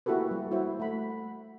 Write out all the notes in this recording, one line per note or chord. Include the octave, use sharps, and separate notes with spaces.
A#3 E4 F#4 G4 A4 B4
G3
E4 F#4 C5
A3 F#5 B5
F#5